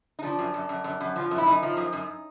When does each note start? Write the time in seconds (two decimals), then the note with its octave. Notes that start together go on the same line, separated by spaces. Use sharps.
0.19 D#4
0.23 F3 D4
0.39 F#2
0.54 F#2
0.69 F#2
0.84 F#2
1.01 F#2
1.16 F3
1.31 F#2
1.38 E4
1.46 F#2 D#4
1.63 F3
1.77 F#2
1.93 F#2